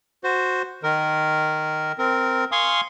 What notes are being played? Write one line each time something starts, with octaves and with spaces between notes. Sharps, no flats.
F#4 C5
D#3 A#4
C4 A#4
F5 G#5 C6 C#6 D#6